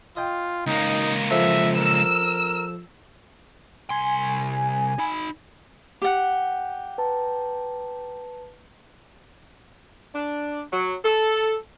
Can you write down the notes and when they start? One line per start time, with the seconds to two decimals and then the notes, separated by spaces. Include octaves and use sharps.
0.17 F4 D#5 G5
0.66 C#2 A#3 D#4
1.31 F2 E5
1.77 A#4 E6
3.90 C2 G#5 C6
4.98 D#4 B5
6.02 G4 F#5
6.98 B4 A5 A#5
10.15 D4
10.71 F#3
11.05 A4